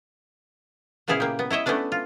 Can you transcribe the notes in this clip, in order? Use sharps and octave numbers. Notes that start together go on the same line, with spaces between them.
A#2 C#3 B3 E4 G#4 F5
A#3 G4
B3
E4 C#5 D#5 E5
A3 B3 C#4 D4 B4
F4